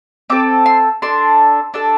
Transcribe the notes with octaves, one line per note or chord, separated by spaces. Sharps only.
C4 A4 D6
C6
D4 A4 C6
D4 A4